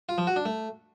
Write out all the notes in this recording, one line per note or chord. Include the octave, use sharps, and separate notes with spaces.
F4
F3
F#4
D4
A3